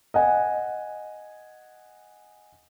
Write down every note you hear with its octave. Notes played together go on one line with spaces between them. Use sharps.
D#5 F#5 G#5